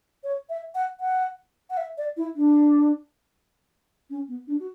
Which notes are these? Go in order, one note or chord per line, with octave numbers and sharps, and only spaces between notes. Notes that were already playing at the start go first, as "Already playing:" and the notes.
C#5
E5
F#5
F#5
F#5
E5
D5
E4
D4
C#4
B3
D4
F#4